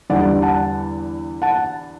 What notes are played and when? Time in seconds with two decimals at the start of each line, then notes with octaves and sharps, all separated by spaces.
0.10 E2 D3 G3 D5 F#5
0.42 F#5 A5
1.42 F#5 A5